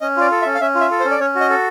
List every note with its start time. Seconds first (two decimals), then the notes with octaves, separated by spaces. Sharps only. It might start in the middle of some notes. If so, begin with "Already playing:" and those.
0.01 C#4 D#5
0.17 F4 D5
0.32 A4
0.42 E5
0.46 C#4
0.55 F5
0.61 C#4 E5
0.75 F4
0.81 E5
0.91 A4
1.00 C5
1.05 C#4
1.11 D5
1.20 C#4 C#5
1.35 F#4
1.41 D#5
1.50 A4